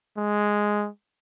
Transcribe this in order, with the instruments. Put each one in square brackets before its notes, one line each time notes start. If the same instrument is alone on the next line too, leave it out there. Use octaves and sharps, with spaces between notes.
[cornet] G#3